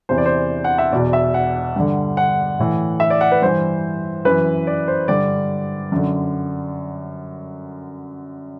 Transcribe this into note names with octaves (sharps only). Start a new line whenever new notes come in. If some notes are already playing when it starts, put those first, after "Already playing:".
E2 C3 E3 C5
D5
C5
F#5
E5
E2 B2 D5
E5
F#5
G2 D3
F#5
A2 E3
E5
D5
F#5
B4
G2 E3 C5
F#2 E3 B4
D5
C5
G2 D3 D5
F#2 D3